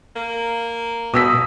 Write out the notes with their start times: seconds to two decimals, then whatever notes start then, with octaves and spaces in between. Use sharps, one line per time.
0.16 A#3
1.14 B2 D#6 E6 B6